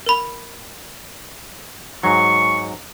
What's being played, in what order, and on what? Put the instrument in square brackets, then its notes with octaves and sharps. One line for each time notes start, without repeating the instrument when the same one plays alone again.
[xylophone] A#4 B5
[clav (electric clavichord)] G#2 F#3 [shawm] C#6